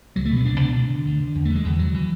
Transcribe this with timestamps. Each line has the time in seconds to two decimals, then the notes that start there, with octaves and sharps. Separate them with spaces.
0.16 C#2 F#3
0.25 A3
0.31 B2
0.36 B3
0.45 C#2 D4
0.60 B2 D4
0.75 D2
0.90 D3
1.05 D2
1.20 D3
1.35 E2
1.45 A3
1.50 D3
1.55 G#3
1.65 E2 E3
1.79 D3 F#3
1.94 E3